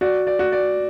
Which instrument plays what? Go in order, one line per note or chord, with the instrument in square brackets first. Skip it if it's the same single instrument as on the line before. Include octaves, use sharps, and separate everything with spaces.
[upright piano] F#4 [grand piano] D5
[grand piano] D5
[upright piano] F#4
[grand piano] D5